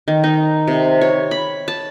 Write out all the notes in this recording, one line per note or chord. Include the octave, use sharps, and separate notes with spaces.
D#3
D#4
C3
C#5
B5
A5